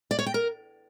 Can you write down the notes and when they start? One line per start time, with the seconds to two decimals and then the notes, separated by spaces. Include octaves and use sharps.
0.11 D5
0.19 C#5
0.26 G5
0.34 A#4